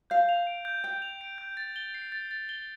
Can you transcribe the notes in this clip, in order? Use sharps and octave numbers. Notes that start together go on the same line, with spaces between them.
F5 G6
F7
D7
G6
G5 G6
F7
D7
G6
A6
G7
C7
A6
A6
G7